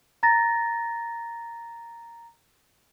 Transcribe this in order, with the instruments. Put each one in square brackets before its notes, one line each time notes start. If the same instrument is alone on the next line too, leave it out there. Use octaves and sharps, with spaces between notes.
[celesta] A#5 A6 A#6